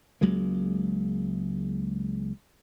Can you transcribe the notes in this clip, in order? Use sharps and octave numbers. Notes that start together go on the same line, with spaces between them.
C#2 F#3 G#3 A#3